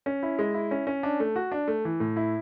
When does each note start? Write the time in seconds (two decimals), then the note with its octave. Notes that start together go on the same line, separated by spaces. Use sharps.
0.06 C#4
0.23 E4
0.39 G#3
0.54 E4
0.71 C#4
0.87 C#4
1.03 D4
1.20 A3
1.36 F#4
1.52 D4
1.68 A3
1.85 E3
2.00 A2
2.16 E4